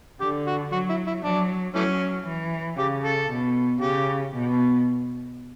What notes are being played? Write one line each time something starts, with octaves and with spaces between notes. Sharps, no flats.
D3 G4
F#4
F#3 F#4
E4
E4
F#3 D4
E3 F#3 A3 C#4
E3
C#3 G4
A4
B2
C#3 G4
B2